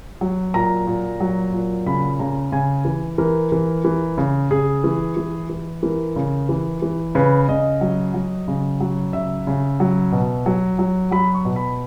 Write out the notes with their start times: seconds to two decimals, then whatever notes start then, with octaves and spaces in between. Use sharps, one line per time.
0.21 F#3
0.54 A#2 A#5
0.87 A#2
1.20 F#3
1.53 A#2
1.86 C#3 B5
2.19 C#3 A#5
2.52 C#3 G#5
2.85 E3
3.18 E3 A#4
3.52 E3
3.85 E3
4.18 C#3
4.51 C#3 G#4
4.84 E3
5.17 E3
5.50 E3
5.83 E3 A#4
6.16 C#3
6.49 E3
6.82 E3
7.15 C#3 B4
7.48 C#3 D#5
7.81 F#3
8.14 F#3
8.48 C#3
8.81 F#3
9.13 C#3 E5
9.47 C#3
9.80 F#3
10.12 B2
10.46 F#3
10.79 F#3
11.12 F#3 B5
11.35 C#6
11.45 B2
11.56 B5